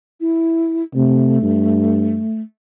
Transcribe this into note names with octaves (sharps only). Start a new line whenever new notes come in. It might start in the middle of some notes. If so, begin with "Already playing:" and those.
E4
C3 A3
G2